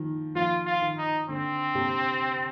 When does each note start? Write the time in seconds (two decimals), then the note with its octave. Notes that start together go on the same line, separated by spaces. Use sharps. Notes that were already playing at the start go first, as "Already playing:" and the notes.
Already playing: D#3 F3
0.35 F3 F4
0.66 F4
0.82 D#3
0.98 D#4
1.29 D3 C4
1.75 C3